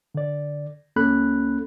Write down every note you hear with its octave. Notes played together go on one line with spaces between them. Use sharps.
D3 D5
C#2 A#3 C#4 A4 B5 F#6